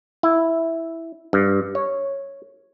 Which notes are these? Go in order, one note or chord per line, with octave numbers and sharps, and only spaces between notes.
E4
G2
C#5